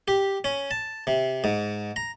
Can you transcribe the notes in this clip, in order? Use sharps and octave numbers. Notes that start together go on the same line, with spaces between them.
G4
C#4
A5
C3
G#2
A#5